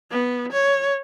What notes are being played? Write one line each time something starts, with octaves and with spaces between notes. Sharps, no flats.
B3
C#5